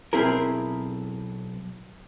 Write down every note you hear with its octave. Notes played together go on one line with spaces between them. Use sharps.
B1 C4 E4 G#4 A#4